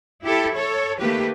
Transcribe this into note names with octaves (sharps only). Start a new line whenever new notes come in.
E4 G4 A4
A4 C#5
D#3 A3 A#3 G4 B4